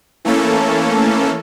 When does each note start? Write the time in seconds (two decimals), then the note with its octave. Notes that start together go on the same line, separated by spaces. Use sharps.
0.25 E3 A3 A#3 C#4 A4